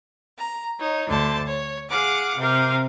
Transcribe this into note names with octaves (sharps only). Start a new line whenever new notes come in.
A#5
D#4 C#5
D2 D3 C5 A5
C#5
G#4 F5 F#5 D6
C3 A#4 F5